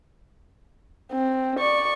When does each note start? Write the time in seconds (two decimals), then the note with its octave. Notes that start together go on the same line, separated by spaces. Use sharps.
1.13 C4
1.59 D5 C#6